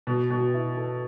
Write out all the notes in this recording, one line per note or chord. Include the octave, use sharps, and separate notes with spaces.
B2
B2
E4
A4